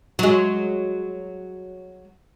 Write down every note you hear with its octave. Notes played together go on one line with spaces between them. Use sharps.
F#3 G#3